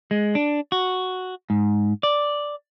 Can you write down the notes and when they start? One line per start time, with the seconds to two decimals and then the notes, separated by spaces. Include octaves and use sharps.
0.11 G#3
0.35 D4
0.72 F#4
1.50 G#2
2.03 D5